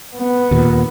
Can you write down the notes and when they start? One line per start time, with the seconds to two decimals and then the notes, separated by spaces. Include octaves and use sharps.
0.16 B3
0.51 D#2 A#2